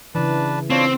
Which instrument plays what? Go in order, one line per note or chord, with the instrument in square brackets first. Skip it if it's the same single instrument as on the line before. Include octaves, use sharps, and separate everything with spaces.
[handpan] C#3 E3 [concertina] D4 B4 A5
[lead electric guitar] C4 [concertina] D4 F4 C#5